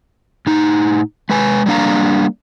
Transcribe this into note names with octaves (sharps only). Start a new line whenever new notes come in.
A2 D#4
G#3 B4 G#5
G3 A#3 D4 F5 A#5